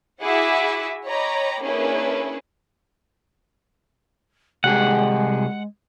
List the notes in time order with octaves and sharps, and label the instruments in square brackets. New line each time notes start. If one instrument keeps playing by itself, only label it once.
[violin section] E4 F#4 G#4 E5 F#5 D6
C#5 D#5 G5 A#5 B5 D6
A#3 C#4 D4 E4 G#4 B4
[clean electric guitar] C2 G4 G#4 [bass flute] G#3 [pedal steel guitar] F#5